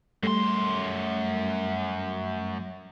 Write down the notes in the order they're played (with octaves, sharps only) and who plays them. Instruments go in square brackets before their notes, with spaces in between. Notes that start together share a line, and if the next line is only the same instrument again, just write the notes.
[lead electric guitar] F#2 C6 [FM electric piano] G3 A3 C7